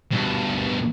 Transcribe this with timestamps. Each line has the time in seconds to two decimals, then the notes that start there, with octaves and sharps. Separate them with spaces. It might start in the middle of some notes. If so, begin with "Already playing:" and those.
0.11 G2 B2